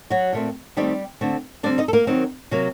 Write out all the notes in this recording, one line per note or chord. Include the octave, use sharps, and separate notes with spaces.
F#3 F#4
A#2 A3 C4
D#3 G3 A3 C4 G4
D3 A3 C4
D3 G3 C4 D4 D5
D#4 D#5
A4
A#3 A#4
D#3 F#3 C4
C3 F#3 A#3